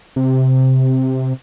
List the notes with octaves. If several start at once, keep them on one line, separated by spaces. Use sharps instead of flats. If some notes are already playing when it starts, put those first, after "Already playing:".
C3